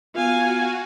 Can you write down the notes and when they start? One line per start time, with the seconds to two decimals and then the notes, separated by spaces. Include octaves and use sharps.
0.15 B3 F4 F#4 F5 G#5